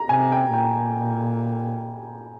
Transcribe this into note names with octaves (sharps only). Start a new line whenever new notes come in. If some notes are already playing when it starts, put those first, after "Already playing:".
Already playing: A#5
C3 G#5
G5
A#2 G5